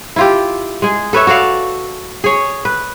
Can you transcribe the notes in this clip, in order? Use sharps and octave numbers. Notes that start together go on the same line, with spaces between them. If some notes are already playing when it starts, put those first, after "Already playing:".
E4 F4 G4
G#3 G#4
A4 B4 C#5 E5
F#4 A4 D5 F5
G#4 C#5
B4